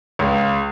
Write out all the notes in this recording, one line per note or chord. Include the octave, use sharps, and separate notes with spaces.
C#2